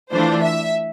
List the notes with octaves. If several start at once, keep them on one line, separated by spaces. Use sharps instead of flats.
E3 A3 D4 F4 C5
E5